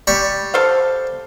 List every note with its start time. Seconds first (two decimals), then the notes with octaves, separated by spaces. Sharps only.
0.07 G3 B5 C#6
0.54 A4 C5 F5